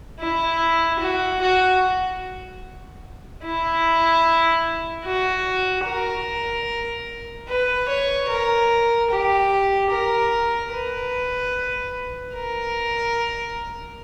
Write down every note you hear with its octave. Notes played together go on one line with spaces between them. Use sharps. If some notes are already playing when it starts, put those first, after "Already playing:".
E4
F#4
F#4
E4
F#4
A#4
B4
C#5
A#4
G4
A#4
B4
A#4